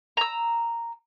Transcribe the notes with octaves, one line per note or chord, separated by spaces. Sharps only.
A#5 E6